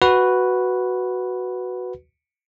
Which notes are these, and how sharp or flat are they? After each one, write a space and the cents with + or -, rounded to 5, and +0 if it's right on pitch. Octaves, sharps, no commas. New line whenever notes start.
F#4 +0 B4 +0